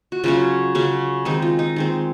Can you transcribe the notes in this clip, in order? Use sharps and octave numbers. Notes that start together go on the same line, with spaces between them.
F#4
C#3 F#3 C#4 F4
C#3 F#3 C#4
D#3 G#3 C4 D#4
F4
D#4
D#3 G#3 C4